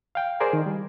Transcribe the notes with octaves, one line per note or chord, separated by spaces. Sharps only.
F5 G5
G#4 A#4 C5 D5 G#5
D#3
G3